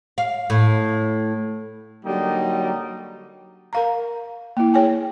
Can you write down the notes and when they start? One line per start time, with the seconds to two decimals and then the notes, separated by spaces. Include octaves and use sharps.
0.18 F5
0.50 A2
2.06 D3 F#3 G3 A#3 D#4
3.73 A#4 F5 A#5
4.57 A#3 E4
4.74 G#4 C#5 G5 G#5